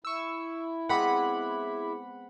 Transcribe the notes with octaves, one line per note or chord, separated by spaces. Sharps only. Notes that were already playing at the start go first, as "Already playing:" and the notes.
E4 C#6 E6
G#3 B3 C4 G#4 F#5 B5 D6